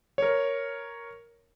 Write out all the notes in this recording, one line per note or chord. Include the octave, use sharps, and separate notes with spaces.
A#4 C#5